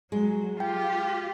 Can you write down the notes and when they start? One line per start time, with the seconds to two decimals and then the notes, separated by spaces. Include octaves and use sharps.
0.12 F#3 G#3
0.60 F4 G4 G5